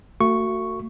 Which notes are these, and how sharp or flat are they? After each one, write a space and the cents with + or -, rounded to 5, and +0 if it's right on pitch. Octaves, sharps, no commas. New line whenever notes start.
A3 +40 F#4 +0 C#6 +0